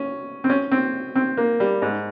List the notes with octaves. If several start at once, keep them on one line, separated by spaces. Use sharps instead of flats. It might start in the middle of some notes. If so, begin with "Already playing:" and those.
Already playing: C#4
C4
C#4
C4
C4
A#3
G3
G#2